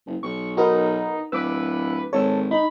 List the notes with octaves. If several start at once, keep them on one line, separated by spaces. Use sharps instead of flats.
F#1
B1 C#6
D#4 F#4 A#4 B4
D1 B4 D6 E6
G#1 A4 C#5
D#4 B5